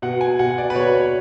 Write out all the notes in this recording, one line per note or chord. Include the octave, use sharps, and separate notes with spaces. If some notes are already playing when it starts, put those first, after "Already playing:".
B2 F#5
G#5
B2 F#5
D5
B4
B2 C#5
C#5